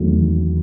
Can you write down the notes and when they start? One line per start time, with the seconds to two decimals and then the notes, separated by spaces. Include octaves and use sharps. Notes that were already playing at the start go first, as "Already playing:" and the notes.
Already playing: E1 D#2 D#3 F#3 A3
0.10 E1